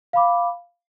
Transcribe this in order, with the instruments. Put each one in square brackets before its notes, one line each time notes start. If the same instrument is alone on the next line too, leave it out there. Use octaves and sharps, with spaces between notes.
[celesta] F5 B5 D6